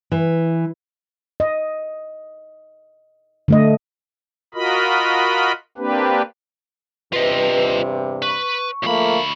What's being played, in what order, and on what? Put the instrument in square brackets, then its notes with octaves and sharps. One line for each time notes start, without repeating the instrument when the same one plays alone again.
[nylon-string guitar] E3
[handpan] D#5
D3 A3 D#5
[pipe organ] F4 F#4 A#4 D#5 B5
A#3 C4 D4 G4 B4
[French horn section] E2 G2 C3 [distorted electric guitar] F4 D#5 [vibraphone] B4
[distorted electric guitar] B4 [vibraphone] C#6
[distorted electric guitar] D2 B5 [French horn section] F3 A3 A#3